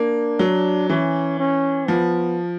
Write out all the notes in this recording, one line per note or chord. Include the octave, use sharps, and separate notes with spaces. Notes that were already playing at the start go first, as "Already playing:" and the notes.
Already playing: A#3 D4
F#3
E3 C#4
C#4
F3 B3